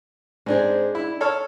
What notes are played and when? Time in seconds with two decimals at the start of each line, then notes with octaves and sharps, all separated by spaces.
0.46 G#2 G#3 C4 D4 G#4
0.95 E4
1.21 A4 C#5 F6